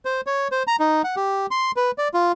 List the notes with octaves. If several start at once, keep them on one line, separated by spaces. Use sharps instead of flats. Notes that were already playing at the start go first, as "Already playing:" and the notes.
C5
C#5
C5
A#5
D#4
F#5
G4
C6
B4
D5
F4